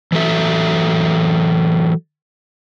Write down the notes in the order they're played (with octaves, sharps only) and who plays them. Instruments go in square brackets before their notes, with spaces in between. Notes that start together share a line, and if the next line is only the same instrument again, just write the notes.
[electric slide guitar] E3 F#3 A4 E5